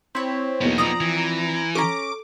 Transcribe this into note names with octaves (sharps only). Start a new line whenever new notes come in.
C4 E4 C#5
E2 B2 A#3 B3 D#4
F3 C4 D5 A#5 D#6
E3
C#4 A4 A#5 D6